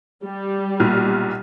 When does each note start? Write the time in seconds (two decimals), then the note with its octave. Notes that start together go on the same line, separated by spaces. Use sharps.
0.24 G3
0.80 B1 A#2 F6